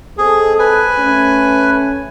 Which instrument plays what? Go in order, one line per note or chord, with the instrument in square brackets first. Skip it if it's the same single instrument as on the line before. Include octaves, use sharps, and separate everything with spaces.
[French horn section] G#3 C4 A4 [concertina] G#4
[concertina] B4 G#5
[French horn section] A3 C#4